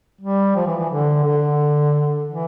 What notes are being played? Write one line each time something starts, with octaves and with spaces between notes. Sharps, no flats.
G3
F3
E3
E3
D3
D3
E3